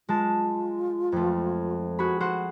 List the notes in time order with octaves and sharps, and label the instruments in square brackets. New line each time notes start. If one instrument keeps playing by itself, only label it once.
[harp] G#3 A5 [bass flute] F4
[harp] F2 A3
F#4 G#4 B5
F#4 C5 F#5